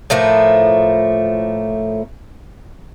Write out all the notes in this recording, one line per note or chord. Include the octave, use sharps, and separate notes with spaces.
A2 F3 A3 A#3